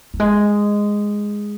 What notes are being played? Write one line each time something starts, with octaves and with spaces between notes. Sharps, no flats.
F#3
G#3